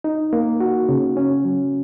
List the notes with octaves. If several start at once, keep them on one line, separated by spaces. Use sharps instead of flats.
D#4
A#3
F#4
C#3
C#4
F#3